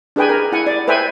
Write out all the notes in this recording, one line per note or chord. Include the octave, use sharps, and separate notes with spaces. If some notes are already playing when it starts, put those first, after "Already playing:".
D4 G#4 B4 G5 G#5
A#4
E4 F#5 G#5
D5
B4 C5 E5 G5 G#5